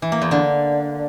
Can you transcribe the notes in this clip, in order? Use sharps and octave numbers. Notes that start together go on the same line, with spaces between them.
E3
A#3
E2
D3